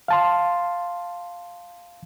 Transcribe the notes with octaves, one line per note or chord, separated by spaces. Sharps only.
F5 A5 C6